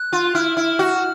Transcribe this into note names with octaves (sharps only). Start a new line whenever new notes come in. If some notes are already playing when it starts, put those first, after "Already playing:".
Already playing: F#6
F4
E4 F6
E4
F#4